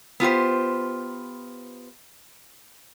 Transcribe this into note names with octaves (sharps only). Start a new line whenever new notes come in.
B3 F4 G4 C5